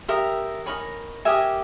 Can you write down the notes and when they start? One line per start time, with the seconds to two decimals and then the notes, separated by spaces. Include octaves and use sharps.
0.08 G4 A#4 D#5 E5
0.66 D#4 A#4 C#5 G#5 B5
1.25 G4 A#4 D#5 E5 G#5